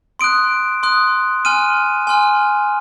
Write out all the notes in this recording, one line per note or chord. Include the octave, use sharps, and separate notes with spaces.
C6 D#6 F#6 D7
C6 D#6 F#6
G#5 C6 F6 D#7
G#5 C6 F6